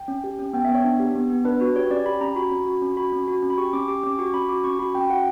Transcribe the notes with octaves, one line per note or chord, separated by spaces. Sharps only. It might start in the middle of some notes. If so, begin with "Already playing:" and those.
Already playing: G5
C#4
G4
C#4
B3 G5
B3 E5
C#5
D4
G4
B3
B3
D4 B4
F#4 B4
G4 C#5
C#4 D5
G4 B5
C#4 A#5
F#4 B5
C#4
F#4
C#4
F#4 B5
C#4
F#4
C#4
B5
G4 C#6
C#4 D6
G4 D6
C#4 D6
F#4 C#6
C#4 B5
F#4 D6
C#4 C#6
F#4 B5
C#4 G5
F#4 F#5